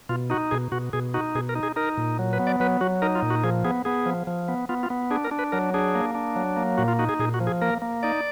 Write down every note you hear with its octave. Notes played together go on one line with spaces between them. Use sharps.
B2 F4
D#4 F#4
B2 G#4
B2 F#4
B2 G#4
D#4 F#4
B2 G#4
A#4
D#4
G#4
D#4 A#4
A#2
F#3
B4
B3
D5
F#3 B4
F#3 F#4
D#4 A#4
F4
A#2
F#4
F3 G#4
B3 G#4
B3 G#4
F3
F3
B3
B3 F4
F4
B3
D4 G#4
A#4
D4
B4
F#3 A#4
D4 G#4
A#3
D4
F#3
A#3
A#2 F#4
F4
D#4 F#4
G#4
A#2 G#4
F#4
F3
G#4
A#3 A#4
A#3
D#4 D5